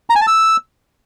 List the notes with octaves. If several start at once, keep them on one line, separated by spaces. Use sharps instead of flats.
A#5
G#5
A5
E6